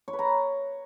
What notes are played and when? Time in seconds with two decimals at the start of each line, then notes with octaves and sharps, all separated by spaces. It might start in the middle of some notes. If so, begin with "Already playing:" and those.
0.08 C#5
0.13 B4
0.19 A#5